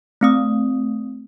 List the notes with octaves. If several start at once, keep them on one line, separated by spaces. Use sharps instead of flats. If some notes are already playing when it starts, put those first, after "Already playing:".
A3 C4 D#6